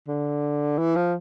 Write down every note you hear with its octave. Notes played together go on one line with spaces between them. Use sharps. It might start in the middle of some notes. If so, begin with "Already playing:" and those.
D3
E3
F3